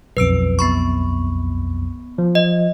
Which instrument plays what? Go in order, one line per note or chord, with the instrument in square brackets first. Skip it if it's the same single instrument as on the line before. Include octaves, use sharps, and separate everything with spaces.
[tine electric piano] B1 F2 [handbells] B4 E6 D7
[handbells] B3 B5 C#6
[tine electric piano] F3
[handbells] D#5